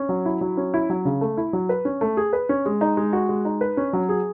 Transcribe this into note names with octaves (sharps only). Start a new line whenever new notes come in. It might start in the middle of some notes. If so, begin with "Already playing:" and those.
Already playing: C#4
F#3
E4
F#3
C#4
E4
F#3
C#3
A3
E4
F#3
B4
C#4
A3
G#4
B4
C#4
G#3
D#4
G#3
F#4
G#3
D#4
B4
C#4
F#3
G#4